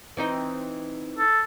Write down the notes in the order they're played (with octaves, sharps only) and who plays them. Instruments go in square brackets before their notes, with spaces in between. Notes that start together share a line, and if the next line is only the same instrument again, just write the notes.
[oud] E3 C4 D#4
[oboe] A4